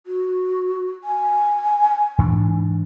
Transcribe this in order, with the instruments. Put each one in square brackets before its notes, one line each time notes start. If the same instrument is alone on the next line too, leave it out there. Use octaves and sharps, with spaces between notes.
[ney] F#4
G#5
[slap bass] G#2 E3 D4